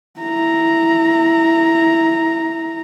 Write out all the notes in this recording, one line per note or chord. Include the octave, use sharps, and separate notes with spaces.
E4 A#5